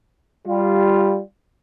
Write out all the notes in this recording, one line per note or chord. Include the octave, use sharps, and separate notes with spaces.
G3 F4